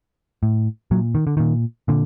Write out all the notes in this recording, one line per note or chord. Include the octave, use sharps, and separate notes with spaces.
A2
A#2 F#3
D#3
D3
A#2 D#3
A#2 D3